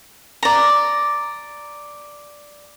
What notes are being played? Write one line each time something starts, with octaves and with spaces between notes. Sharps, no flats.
D5 A#5